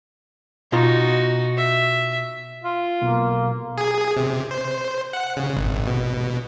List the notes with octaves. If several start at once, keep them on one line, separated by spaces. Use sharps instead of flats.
B2 D#4 F4 F#4 A#5
E5
F4
B1 A#3
G#4
C3
C5
F#5
C#3
G#1
B2